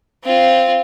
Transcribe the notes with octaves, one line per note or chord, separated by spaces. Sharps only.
C4 F4